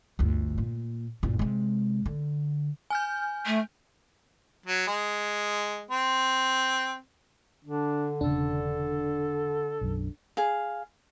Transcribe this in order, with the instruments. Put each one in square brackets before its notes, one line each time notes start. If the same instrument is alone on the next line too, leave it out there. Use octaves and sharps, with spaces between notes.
[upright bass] G1 D2
A#2
F#1 A#2
C3 G#3
D3
[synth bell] G#5 F6 G6
[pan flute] A3
[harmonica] F#3
G#3
C4
[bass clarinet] D3 [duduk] D4
[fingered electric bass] E1 C#3 [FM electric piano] D4 [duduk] A4
[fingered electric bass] B1 F#2
[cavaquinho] G#4 F5